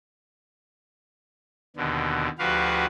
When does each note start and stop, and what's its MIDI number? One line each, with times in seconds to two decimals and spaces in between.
1.76 2.28 39
1.76 2.28 47
1.76 2.28 50
2.39 2.86 38
2.39 2.86 53
2.39 2.86 66
2.39 2.86 67
2.39 2.86 71
2.39 2.86 77